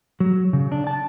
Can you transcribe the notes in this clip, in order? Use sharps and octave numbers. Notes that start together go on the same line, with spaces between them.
F#3
C#3
D4
A5